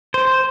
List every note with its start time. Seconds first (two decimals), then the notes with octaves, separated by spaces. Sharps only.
0.14 C5